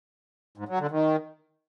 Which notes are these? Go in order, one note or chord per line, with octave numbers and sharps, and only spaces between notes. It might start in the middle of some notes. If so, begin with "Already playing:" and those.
G#2
F#3
D3
D#3